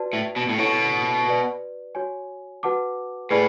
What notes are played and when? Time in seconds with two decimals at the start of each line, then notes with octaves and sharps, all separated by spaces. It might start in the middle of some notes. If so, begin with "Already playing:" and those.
Already playing: F#4 B4 D5 A5
0.13 A2
0.36 B2
0.49 A2
0.58 B2 E4 A4 C#5 F#5 C#6
1.27 F#4 B4 D5
1.95 F#4 C#5 G#5
2.63 F#4 B4 F#5 A5 D6
3.31 A2 G#4 B4 D5 G#5 B5